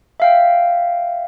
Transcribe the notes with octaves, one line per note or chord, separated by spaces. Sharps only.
E5 F5 G5